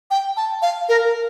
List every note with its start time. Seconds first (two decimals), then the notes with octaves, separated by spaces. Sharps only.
0.11 G5
0.37 A5
0.62 F5
0.89 A#4